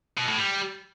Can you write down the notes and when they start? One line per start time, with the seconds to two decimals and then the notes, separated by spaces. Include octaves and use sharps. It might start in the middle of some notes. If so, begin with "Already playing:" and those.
0.17 B2
0.28 A2
0.38 G3